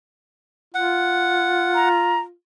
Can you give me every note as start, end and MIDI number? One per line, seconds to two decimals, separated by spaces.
0.75 2.34 65
0.75 1.89 78
1.75 2.20 82